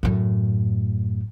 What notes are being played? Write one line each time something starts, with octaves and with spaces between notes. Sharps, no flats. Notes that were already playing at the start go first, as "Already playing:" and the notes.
F#2 A2